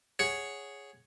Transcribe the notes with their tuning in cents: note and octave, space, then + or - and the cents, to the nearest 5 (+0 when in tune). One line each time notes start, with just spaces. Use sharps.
G#4 +0 C#5 +0 F#5 +0